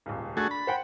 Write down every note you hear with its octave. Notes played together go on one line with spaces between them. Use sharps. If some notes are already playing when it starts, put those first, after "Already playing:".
D#1 C#2
A3 D4 F#4 G#4 C#6 A6
B5
C5 F#5 G5